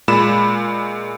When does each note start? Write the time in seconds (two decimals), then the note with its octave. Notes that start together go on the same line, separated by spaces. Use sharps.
0.08 A#2 G#3 B5 E7